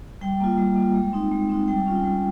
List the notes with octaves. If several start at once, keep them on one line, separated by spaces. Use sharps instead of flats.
G3 G5
A#3 F4
G3
A#3 F4
G#3
C4 D#4
G#3
C4 D#4
G3 G5
G#5
C#4 F4
G5
G3 G#5